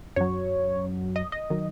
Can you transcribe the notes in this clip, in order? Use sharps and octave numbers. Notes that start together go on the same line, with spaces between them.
F#2 F#3 C#5
D#5
D#5
D#3 F#3